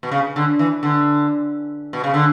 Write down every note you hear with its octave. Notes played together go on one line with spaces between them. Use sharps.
B2
C#3
D3
E3
D3
B2
C#3
D3